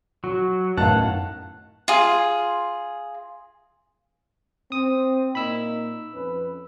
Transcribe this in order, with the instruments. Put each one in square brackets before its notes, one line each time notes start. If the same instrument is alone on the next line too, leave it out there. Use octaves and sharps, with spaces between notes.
[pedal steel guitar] F#3 [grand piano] F#4
[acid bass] F#2 [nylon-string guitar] A2 D#3 B3 [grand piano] F5 A5 [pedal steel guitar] F#5
[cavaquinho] F4 G#4
[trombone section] C4 [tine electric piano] D#6
[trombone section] A#2 A#3 D#4 [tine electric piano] B5 E6
[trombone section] F2 C#4 B4